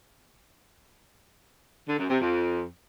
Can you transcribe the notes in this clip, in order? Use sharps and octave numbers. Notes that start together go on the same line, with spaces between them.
D3
F#2
C3
F2